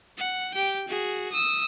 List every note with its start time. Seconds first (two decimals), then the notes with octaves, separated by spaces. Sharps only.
0.18 F#5
0.54 G4 G5
0.88 F#4 G#4
1.32 D#6 E6